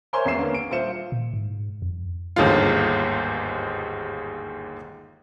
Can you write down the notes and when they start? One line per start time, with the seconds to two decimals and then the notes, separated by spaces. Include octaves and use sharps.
0.13 A#4 C5 C#5 E5 G#5 C6
0.25 G#1 E2 A#3 E5 C7 E7
0.38 D3 A#3 B3 C#4
0.55 D7
0.71 D#1 F4 C5 E5 C#7 E7
1.12 A#2
1.34 G#2
1.82 F2
2.36 G1 D#2 G#2 D3 F4